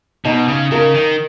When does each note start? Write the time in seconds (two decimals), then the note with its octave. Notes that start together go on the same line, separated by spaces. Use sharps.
0.25 B2 D#4
0.48 C#3
0.71 C#3 A#4
0.94 D#3